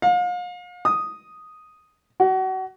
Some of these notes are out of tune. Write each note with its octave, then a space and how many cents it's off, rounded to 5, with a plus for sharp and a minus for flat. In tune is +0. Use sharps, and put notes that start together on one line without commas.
F5 +40
D#6 +0
F#4 +30